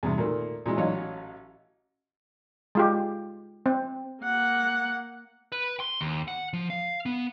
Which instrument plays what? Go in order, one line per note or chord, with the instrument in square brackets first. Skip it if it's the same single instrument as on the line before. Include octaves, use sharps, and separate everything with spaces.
[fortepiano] E2 G2 C3
A#2 D#3 A3 A#3
A#2 E3 G#3
A1 F#3 C#5 D#5 F5
[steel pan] G#3 F4 G4
C4
[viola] A#3 F#5
[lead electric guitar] B4
C6
D#2
F#5
F3
F5
B3